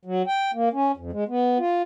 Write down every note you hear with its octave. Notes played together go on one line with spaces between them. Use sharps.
F#3
G5
A#3
C#4
F2
G#3
B3
F4